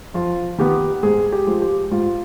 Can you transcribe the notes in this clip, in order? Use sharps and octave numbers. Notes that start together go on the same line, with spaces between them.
F2 F4
D#3 B3 G4
G#2 G#4
G4
F3 G#3
G4
G#2 F4